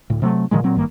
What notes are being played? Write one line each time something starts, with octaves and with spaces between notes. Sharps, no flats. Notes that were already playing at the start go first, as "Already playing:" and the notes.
D2 A2
C3 F#3 A3
A#2 D#3 F3 G#3
A#2 F#3 C4
G#1 G2 D#3 A#3